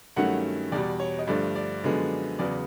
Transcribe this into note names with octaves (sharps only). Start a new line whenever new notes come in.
G2 D#3 F#3 A3 C#4 F#5
E2 B2 G3 D5
C#5
D#5
G2 D3 F3 A3 D5
D5
F#2 D3 F3 G#3 B3
E2 C#3 F#3 B3 D5